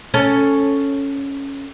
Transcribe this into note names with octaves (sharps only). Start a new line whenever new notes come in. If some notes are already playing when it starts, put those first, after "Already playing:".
C#4 A4